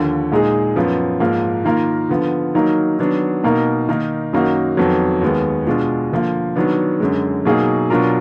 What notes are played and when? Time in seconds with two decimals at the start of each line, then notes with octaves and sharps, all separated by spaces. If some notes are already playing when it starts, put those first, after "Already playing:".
Already playing: D#2 D3 F3
0.32 A#2 G#3 D#4 G#4
0.76 F#2 F3 B3
1.20 G#2 F3 A#3
1.65 D#3 A#3 F4 A#4
2.09 D3 F3 B3
2.54 D#3 F#3 A#3 D#4 A#4
2.99 D#3 F#3 B3 D4
3.44 B2 A#3 D#4 A#4
3.89 D#3 A#3 D#4
4.33 F#2 D#3 A#3 D#4 F#4
4.77 F2 D#3 F#3 B3
5.22 D#2 D#3 G#3 B3
5.67 B2 G#3 D4 F4
6.11 D3 F3 A#3
6.55 D#3 F#3 B3 D4
7.00 F#2 D3 G#3
7.45 B2 F#3 A#3 D#4 G#4
7.90 B2 F#3 D4 F4 A#4